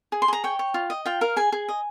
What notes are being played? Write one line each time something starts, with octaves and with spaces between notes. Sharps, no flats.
G#4
C6
G#4 A#5
C#5 G5
C#5
F4
D#5
F4 G5
A#4 F5
G#4 G#5
G#4
D#5